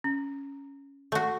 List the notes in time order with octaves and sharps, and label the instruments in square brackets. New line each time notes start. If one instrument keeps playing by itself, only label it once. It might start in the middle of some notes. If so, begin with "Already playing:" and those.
[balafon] C#4
[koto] A3 F#4